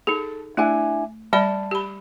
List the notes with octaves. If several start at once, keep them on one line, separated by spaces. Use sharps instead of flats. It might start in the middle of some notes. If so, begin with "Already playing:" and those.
D#4 G#4 A4
A3 D4 E4 G#5
G3 D5 A5 B5
G4 B5